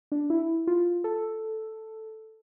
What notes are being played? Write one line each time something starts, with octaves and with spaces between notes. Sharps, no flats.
D4
E4
F4
A4